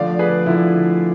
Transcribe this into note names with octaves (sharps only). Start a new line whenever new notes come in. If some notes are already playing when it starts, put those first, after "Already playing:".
Already playing: D3 F3 A3 D5 F5
G#4 B4
D3 F3 A3 E4